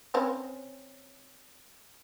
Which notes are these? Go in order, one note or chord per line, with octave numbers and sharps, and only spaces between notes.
C4 C#4 B4